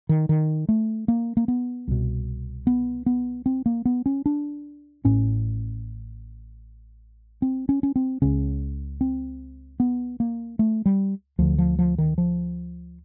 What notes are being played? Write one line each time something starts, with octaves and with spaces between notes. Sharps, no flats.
D#3
D#3
A3
A#3
A#3
B3
C2 B2
B3
B3
C4
A#3
B3
C#4
D4
A1 A2 C#4
C4
C#4
C#4
C4
C#2 C#3 C#4
C4
B3
A#3
A3
G3
D2 D3 F3
F3
F3
D#3
F3